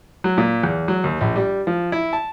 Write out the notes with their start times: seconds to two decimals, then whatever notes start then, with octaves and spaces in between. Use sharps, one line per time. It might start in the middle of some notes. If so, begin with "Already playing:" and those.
0.24 F#3
0.38 A#2
0.64 E2
0.88 F#3
1.04 D#2
1.21 A#1
1.36 G3
1.67 F3
1.92 E4
2.13 A5